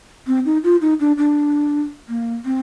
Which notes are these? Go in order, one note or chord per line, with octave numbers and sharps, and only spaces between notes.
C4
D#4
F4
D#4
D4
D4
A#3
C4